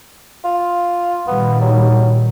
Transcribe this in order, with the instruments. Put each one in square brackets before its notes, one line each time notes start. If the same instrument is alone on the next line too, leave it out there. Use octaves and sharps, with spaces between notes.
[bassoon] F4
[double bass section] A#2 D#3 G3 [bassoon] B3
[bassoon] F#3